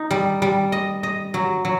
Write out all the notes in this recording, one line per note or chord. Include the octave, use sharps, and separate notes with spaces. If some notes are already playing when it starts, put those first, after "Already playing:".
Already playing: D#4
G3
G3
D#5
D#5
F#3
F#3